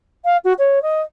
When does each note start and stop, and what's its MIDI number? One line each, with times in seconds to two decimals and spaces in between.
0.24 0.37 77
0.44 0.53 66
0.58 0.82 73
0.82 1.02 75